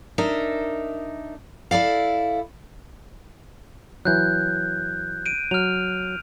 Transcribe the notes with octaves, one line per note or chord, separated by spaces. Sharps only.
D4 D#4 A#4 E5
E4 A4 D5 F5
E3 F#3 F#6 G6
D7 D#7
F#3 F6 F7